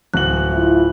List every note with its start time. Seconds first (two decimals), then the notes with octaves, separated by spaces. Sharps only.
0.14 D1 F#4 F#6 F#7
0.52 E4 F4